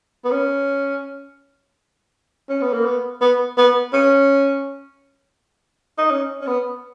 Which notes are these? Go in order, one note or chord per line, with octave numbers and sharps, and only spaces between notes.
B3
C#4
C#4
B3
A#3
B3
B3
B3
C#4
D#4
C#4
C#4
B3